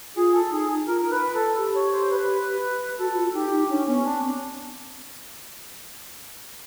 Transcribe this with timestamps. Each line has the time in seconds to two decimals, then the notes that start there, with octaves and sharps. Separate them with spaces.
0.16 F4 G#4
0.34 A4
0.51 D#4 G#4
0.87 F4 A#4
1.01 A#4
1.11 B4
1.34 A4
1.58 G4
1.75 C#5
1.93 C5
2.11 B4
2.99 F#4 A4
3.11 F#4
3.17 F4
3.34 D#4 G4
3.52 D#4
3.69 C#4 D4
3.87 B3 C#4
4.05 C4 D4